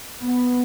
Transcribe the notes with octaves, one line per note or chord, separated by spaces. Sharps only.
B3